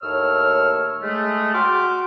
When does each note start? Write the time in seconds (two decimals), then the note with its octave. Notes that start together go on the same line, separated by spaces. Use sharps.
0.02 D#2 A2 C#5 E6 F6
1.02 G#3 A3
1.53 F#4 G5 C6 D6 F6